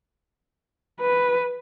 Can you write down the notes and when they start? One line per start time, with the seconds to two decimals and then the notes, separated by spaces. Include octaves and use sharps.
1.01 B4